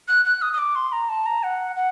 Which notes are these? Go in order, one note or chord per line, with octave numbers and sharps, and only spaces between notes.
F#6
F#6
D#6
D#6
D6
C6
A#5
A5
A#5
F#5
F#5